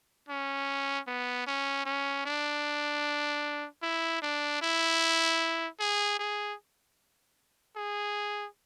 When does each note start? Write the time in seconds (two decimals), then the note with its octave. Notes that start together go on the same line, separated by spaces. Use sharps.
0.29 C#4
1.07 B3
1.47 C#4
1.86 C#4
2.26 D4
3.83 E4
4.22 D4
4.62 E4
5.80 G#4
6.19 G#4
7.76 G#4